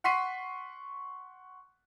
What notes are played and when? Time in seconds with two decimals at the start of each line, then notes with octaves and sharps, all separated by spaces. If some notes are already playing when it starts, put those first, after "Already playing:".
0.04 F#5 C6 C#6 B6 C7 D#7